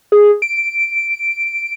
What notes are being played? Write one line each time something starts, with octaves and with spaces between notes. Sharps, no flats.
G#4
D7